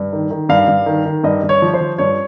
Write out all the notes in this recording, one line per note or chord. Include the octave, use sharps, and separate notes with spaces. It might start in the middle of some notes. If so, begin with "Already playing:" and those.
Already playing: G2
D#3
D#3
G2 F5
G2
D#3
D#3
G2 D#5
G2
C#5
F3
C5
F3
G2 C#5